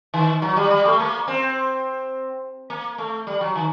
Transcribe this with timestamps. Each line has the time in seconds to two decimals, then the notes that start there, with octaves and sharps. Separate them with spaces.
0.14 D#3
0.42 F#3
0.56 G3
0.70 G3
0.85 A3
0.99 A#3
1.28 C4
2.70 A#3
2.98 A3
3.27 G3
3.41 F#3
3.56 D#3